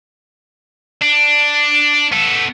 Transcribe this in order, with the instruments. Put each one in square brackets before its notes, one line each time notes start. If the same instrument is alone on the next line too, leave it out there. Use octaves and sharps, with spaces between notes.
[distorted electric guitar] D4
B3 A4